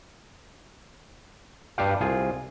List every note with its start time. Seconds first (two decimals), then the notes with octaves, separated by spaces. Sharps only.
1.78 G2 D4 G4 F5
2.01 C2 F4 G#4